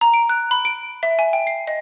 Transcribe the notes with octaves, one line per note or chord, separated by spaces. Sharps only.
A#5
D7
F#6
B5
D7
E5
G#5
G5
C7
D#5